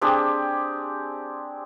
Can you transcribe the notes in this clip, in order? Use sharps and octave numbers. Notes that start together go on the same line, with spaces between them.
C4 D4 G4 G#4